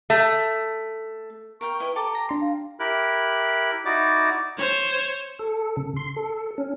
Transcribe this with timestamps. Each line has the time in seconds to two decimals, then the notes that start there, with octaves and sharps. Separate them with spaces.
0.10 A3
1.61 A#4 F5 G5 C#6
1.80 E4 B4 D#5
1.96 G4 A4 A#5 D6
2.15 A#6
2.29 D4 C6
2.41 F5
2.80 E4 G4 A#4 F#6
3.85 D#4 E4 F#4 D5 D6
4.58 C5 C#5
5.39 A4
5.77 C#3
5.96 C6
6.16 A4
6.58 C#4